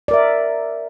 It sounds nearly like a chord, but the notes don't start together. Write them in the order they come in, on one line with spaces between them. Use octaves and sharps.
D5 A#4 E5